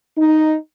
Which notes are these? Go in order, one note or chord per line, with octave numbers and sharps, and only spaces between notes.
D#4